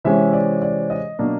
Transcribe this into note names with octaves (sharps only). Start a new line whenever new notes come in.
C3 E3 G#3 C#4 E5
D5
D5
D#5
B2 F#3 A#3 D4